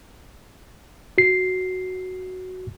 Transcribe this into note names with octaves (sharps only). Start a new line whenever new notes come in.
F#4 C7